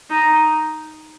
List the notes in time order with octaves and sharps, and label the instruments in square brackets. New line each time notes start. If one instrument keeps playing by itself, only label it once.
[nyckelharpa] D#4